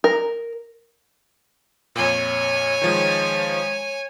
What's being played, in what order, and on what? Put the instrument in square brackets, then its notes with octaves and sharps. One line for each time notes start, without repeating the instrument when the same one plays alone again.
[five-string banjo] A#4
[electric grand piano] F2 A#2 [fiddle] C#5 G#5
[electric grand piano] D#3 F3 G#3